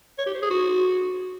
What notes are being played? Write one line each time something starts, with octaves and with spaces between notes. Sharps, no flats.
C#5
G4
C5
G#4
F#4